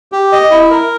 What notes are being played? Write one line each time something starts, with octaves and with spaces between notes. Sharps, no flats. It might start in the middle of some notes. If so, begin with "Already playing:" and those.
G4
D#5
E4
A#4